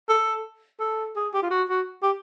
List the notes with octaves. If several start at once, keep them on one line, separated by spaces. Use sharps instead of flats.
A4
A4
G#4
G4
F4
F#4
F#4
G4